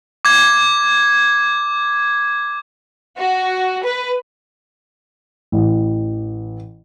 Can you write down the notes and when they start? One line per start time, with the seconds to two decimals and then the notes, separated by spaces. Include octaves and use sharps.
0.25 D6 G#6
3.19 F#4
3.84 B4
5.52 A1